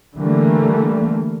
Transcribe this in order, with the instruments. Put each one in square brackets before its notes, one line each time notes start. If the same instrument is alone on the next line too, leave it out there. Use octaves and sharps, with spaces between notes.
[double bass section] D3 E3 G3 A3 A#3